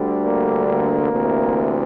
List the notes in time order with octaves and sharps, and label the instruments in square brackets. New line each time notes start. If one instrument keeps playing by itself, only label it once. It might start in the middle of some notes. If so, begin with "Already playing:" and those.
Already playing: [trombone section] D2 D3 G3
A#3
A#3
D2 C3 E3